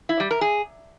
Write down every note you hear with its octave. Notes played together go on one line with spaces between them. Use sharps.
E4
G3
A#4
G#4